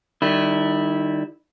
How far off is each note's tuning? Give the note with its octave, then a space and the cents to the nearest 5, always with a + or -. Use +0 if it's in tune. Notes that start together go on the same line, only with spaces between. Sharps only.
D#3 -35 G3 +0 E4 -10